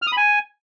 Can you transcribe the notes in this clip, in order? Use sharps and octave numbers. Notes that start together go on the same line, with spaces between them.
F6
D#6
B5
G#5